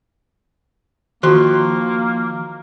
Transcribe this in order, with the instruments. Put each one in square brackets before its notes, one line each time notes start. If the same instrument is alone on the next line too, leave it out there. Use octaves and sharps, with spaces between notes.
[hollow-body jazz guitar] D#3 F3 C6 [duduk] A#3 [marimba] F#4